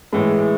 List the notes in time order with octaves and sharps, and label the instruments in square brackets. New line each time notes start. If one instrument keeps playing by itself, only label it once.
[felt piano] A2 E3 G#3